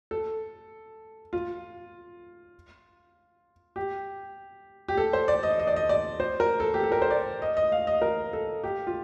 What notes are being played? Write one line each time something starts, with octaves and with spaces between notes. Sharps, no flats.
A4
F4
G4
G4
A4
C5
D5
D#5
D#5
D5
D#5
D5
C5
A#4
A4
G4
A4
A#4
C5
D5
D#5
D#5
F5
D#5
A#4
A4
G4
F4